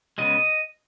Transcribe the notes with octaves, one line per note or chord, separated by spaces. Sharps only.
C#3 G#3 B3 D#5